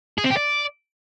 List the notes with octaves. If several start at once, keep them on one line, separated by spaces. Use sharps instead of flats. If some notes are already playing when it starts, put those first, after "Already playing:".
G#4
C4
G4
D5